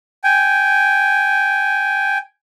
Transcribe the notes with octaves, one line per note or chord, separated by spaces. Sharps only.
G5 G#5